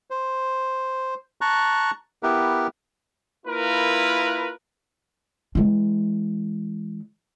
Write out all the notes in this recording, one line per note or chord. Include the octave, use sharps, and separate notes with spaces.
C5
A5 A#5 C#6 F#6
B3 E4 G4 A#4 B4
A#3 E4 F4 A#4 B4
E3 G#3